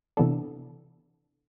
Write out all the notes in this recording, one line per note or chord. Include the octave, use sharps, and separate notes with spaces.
C3 E3 B3 D4 A4